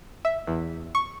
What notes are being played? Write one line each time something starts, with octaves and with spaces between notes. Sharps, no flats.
E5
E2
C#6